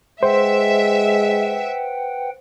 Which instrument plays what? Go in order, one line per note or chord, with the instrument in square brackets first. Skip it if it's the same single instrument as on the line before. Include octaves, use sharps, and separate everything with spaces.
[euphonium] G#3 [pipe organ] B4 F#5 G5 [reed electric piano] C5 [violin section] E5